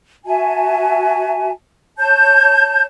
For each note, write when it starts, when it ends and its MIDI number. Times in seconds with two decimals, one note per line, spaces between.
0.26 1.51 66
0.26 1.51 76
0.26 1.51 80
0.26 1.51 81
1.99 2.84 73
1.99 2.84 81
1.99 2.84 91